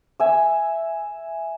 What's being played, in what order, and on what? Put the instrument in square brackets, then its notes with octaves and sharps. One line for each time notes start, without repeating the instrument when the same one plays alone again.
[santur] E5 G#5